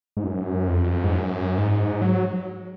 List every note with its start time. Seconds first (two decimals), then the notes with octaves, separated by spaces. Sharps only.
0.17 G#2
0.24 F#2
0.68 F2
1.04 G#2
1.13 F#2
1.58 G#2
2.02 F#3